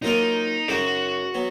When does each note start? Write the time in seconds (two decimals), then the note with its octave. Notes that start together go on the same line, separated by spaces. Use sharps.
0.02 F#3 A#3 D#4 F4 A#4 D#5
0.68 F#2 C#3 G#3 D#4 F#4
1.34 F#3 B3